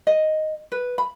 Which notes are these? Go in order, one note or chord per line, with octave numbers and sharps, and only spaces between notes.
D#5
B4
B5